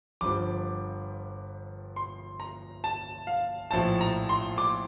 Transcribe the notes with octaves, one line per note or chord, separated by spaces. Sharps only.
G1 G2 F3 D6
C6
A#5
A5
F5
A#1 A2 F3 A5
A#5
C6
D6